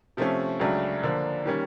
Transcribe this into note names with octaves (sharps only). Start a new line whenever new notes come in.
C3 F3 A3 C#4
C#2 C#3 F#3 A3 D4
D3 F3 A#3 D4
D#3 G3 A#3 C#4